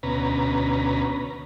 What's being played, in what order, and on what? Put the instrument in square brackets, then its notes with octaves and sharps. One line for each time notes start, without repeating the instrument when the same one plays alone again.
[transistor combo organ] D2 B2 C#4 B4 A#5